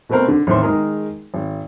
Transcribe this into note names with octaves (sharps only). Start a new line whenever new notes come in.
B2 A3 B3 C4 A#4
D3
A1 D#2 E3 C4 E5 C6
D#3 G#3 G#4 A#4
G#1